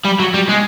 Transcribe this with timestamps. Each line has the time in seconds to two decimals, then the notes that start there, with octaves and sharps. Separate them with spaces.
0.05 G3
0.20 F#3
0.34 G3
0.49 G#3